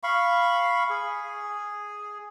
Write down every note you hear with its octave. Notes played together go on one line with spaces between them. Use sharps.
F5 B5 C#6
G#4